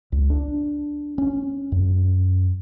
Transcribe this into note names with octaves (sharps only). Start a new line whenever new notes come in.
C#2
D4
C#4
F#2